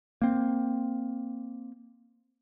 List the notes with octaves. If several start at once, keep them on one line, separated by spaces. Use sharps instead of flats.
A#3 C4